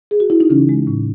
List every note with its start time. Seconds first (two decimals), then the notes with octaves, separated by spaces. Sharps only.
0.11 G#4
0.20 F#4
0.30 E4
0.40 D#4
0.50 C#3 E3 C#4
0.69 G#3
0.87 A2